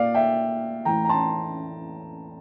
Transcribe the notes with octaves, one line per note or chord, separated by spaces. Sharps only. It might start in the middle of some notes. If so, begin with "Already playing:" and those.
Already playing: A#2 D5 F5
E5 G5
A2 E3 G5 A#5
A#5
A5 C6